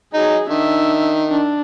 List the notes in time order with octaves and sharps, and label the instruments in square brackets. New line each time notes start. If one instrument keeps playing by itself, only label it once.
[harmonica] F#3 D#4 [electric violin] G#4
[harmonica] D#3 [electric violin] D4 E5
[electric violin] D4